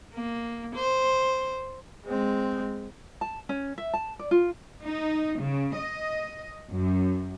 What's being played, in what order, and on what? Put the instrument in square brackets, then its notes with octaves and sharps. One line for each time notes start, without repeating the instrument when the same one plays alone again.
[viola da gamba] A#3
C5
[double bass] G#3 C4
[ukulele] A5
C#4
E5
A5
D5
F4
[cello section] D#4
C#3
D#5
F#2